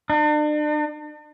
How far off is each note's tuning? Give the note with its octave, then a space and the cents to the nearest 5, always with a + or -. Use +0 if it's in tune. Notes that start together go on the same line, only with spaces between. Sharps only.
D4 +40